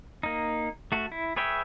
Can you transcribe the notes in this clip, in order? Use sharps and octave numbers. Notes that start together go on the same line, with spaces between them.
A#3 D#4
A3 F#4
E4
G#4 B4 C#5 E5 G5